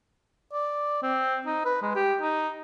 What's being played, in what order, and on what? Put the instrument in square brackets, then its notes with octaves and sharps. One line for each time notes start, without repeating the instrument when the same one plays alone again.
[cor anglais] D5
C4
D#4
B4
G#3
G4
D#4